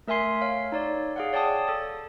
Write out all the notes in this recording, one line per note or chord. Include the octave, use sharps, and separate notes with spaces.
A3 A#4 E5 G#5 C6 C7
C#5 F5
D#4 C#5 D5
G#4 F5 F#5
C#5 D5 G5 A5 D#6
A4 A6